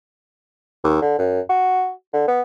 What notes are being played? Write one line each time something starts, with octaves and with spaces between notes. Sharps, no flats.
D#2
D3
F#2
F#4
D3
B3